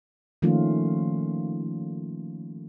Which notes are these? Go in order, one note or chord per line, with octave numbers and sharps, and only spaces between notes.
D#3 F3 A3 A#3 C#4 F4